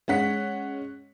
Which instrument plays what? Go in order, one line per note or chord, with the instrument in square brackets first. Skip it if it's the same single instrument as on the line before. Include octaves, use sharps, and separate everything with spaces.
[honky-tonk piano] G#3 C#4 F#5 B6